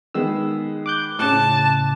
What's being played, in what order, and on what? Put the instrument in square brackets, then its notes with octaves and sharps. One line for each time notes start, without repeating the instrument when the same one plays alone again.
[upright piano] D#3 G#3 B3 [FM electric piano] E6
[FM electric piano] D6 F#6 G6
[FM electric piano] A2 C#3 [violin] A5 [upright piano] D6 F#6